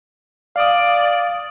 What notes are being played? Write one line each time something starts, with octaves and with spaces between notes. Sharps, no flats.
D5 F5 D#6